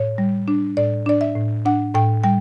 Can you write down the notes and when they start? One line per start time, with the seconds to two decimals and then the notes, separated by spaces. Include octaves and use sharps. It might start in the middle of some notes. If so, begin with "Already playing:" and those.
Already playing: A2 C#5
0.18 G3
0.48 D4
0.77 A2 D5
1.06 D4 D5
1.21 E5
1.36 A2
1.65 D4 F#5
1.94 A2 G5
2.24 G3 G5